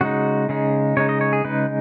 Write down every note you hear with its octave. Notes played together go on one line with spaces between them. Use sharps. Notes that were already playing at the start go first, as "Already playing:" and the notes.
C#3 G#3 D#4 F#4
C#3 G#3 D#4
C#3 G#3 D#4 C#5
D#5
C#5
G#4
C#3 G#3 D#4 B4